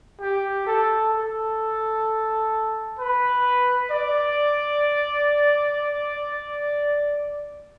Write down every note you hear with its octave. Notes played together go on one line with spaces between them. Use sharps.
G4
A4
A4
B4
D5